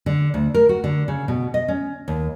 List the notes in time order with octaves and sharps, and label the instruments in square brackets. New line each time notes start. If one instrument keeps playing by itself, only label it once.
[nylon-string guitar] D3
D2
A#4
F#4
D3
C#3
B2
D#5
C#4
D#2